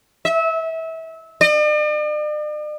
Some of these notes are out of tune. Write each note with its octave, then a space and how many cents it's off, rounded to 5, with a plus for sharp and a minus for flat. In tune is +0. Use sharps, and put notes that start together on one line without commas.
E5 -25
D5 +45